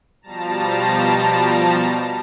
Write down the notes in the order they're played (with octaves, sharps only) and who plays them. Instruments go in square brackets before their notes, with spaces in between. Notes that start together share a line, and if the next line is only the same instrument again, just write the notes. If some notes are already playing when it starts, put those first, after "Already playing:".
[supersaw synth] B2 F3 G3 A5 A#5